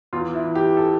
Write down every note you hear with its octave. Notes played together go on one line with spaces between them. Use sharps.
E2 F4
E4
E3
G4
A4